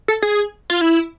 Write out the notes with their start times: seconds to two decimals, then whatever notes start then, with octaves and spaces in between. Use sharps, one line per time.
0.08 A4
0.22 G#4
0.70 F4
0.81 E4